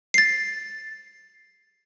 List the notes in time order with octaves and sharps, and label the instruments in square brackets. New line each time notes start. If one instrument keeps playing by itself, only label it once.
[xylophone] A6 C7